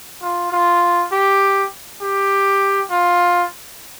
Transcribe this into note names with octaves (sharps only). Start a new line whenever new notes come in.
F4
F4
G4
G4
F4